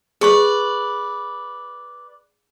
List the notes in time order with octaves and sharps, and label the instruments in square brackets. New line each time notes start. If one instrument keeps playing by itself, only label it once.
[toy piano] G#4 C#6 [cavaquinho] B4 D5